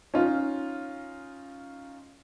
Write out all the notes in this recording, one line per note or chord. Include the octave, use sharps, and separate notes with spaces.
C#4 D#4 F4